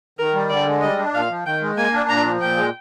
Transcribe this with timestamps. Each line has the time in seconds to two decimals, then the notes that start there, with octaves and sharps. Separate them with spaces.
0.19 D#3 A#4
0.34 G3
0.50 D3 D5
0.66 G#3
0.82 G3 D#5
0.98 D4
1.14 A#2 F5
1.29 F3
1.46 D#3 G5
1.62 G#3
1.78 A#3 G#5
1.93 D4
2.09 A#2 A#5
2.26 F3
2.41 A#2 G5
2.57 G#3